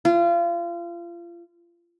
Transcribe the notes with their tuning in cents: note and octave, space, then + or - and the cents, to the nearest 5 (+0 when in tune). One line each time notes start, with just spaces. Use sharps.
F4 -30